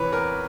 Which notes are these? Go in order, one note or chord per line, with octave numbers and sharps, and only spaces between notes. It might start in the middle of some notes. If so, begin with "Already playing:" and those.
Already playing: C3 E3 B4 C#5
E2 A#4